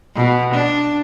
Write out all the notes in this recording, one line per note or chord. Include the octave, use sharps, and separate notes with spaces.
B2
D4